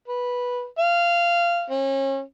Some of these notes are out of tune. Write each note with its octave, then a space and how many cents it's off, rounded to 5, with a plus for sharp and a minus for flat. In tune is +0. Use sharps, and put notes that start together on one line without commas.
B4 -10
F5 -15
C#4 -35